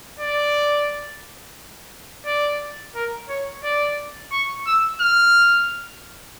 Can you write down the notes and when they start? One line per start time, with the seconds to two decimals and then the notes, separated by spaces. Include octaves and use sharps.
0.20 D5
2.26 D5
2.95 A#4
3.29 C#5
3.64 D5
4.32 C#6
4.67 E6
5.01 F6